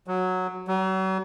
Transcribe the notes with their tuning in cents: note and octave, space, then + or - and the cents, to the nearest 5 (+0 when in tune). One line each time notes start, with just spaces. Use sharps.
F#3 -5
F#3 +40